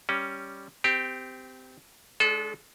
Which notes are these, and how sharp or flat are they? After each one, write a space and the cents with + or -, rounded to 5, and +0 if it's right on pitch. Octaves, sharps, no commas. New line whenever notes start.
G3 +0 C#4 +0
C4 -25 G4 +0
G#3 +10 D4 -25 A4 -30